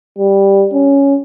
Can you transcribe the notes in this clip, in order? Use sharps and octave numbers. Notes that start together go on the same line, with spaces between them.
G3
C#4